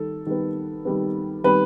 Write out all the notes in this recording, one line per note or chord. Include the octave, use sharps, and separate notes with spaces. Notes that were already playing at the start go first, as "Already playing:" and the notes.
Already playing: D#3 G3 A4
D#3 G3 B3
D#3 G3 B3
D#3 G3 B3 B4